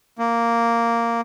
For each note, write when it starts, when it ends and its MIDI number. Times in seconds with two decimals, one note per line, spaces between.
0.19 1.21 58